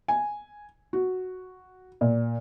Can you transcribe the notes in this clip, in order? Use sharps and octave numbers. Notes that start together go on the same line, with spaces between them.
G#5
F#4
A#2